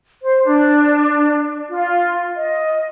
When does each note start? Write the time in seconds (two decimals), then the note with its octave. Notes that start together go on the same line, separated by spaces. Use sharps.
0.22 C5
0.45 D4
1.69 F4
2.37 D#5